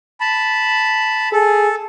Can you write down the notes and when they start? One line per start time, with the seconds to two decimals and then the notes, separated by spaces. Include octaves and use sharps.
0.21 A5 B5
1.32 G#4 A4